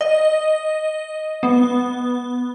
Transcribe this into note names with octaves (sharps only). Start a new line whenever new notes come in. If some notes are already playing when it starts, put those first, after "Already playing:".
D#5
B3